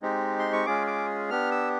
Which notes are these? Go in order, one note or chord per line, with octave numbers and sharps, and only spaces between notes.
G#3 C4 D#4 G4
C6
C#6
G#3 C#4 F4 G#4 D6
D6
B3 D4 G4 F6
E6